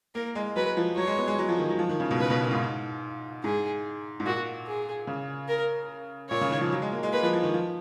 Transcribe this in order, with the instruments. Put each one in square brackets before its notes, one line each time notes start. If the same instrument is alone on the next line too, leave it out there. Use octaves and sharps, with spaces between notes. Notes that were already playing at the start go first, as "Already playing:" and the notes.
[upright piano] A#3 [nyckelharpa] A#4
[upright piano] G#3
[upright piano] F#3 [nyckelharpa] B4
[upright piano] F3
[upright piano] F#3 [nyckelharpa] C#5
[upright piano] G#3
B3
G#3
F#3
F3
D#3
F#3
F3
D#3
C#3
B2
[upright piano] C#3 [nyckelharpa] B4
[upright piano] B2
A#2
G#2
[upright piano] G#2 [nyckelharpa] G#4
[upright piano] G#2
[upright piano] A#2 [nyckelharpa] F#4
[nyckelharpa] G#4
[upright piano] C#3
[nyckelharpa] A#4
[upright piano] A#2 [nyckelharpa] C#5
[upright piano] C#3
D#3
F3
F#3
G#3
A#3
G#3
[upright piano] A#3 [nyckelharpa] B4
[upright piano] F3
F3
D#3
F3